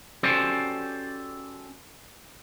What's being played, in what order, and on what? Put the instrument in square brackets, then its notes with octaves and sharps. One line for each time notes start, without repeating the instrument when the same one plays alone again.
[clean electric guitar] C#4 F#4 G4 A4 C5 D5